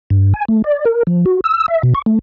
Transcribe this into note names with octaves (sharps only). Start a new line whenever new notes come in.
G2
G#5
A3
D5
A#4
F3
F#4
E6
E5
B2
C#6
A3